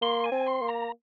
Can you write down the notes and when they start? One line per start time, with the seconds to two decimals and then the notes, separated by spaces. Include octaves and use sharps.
0.02 A#3 C6
0.24 G#5
0.32 C4
0.47 C6
0.62 A#3
0.68 A#5